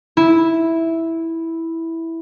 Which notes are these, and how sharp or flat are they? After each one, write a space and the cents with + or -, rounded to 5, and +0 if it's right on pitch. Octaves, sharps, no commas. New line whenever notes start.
E4 -5